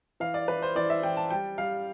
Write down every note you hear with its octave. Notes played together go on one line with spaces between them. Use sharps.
E3 F5
D5
E3 B4
C5
E3 D5
E5
E3 G5
A5
G3 G5
G3 F5